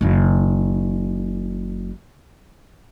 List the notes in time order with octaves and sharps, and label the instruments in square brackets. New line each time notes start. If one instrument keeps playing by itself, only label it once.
[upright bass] F#1 D#3